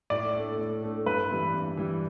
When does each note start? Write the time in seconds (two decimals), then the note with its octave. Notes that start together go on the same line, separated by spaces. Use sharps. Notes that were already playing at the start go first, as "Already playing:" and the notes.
0.10 A2 D5
0.34 A3 D4 A4
0.58 A2
0.82 A3 D4 A4
1.06 G2 B4
1.30 E3 G3 E4
1.54 G2
1.77 E3 G3 E4